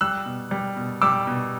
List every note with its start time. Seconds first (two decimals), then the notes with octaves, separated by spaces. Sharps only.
0.01 G3 E6 F#6
0.26 B2
0.51 G3
0.76 B2
1.02 G3 D6 E6
1.27 B2